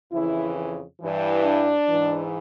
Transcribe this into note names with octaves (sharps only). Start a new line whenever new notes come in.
F2 C#3 E3 E4
G2 E3
D4
G#2 E3